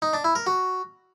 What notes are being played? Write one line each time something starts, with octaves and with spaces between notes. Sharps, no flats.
D#4
D4
E4
A#4
F#4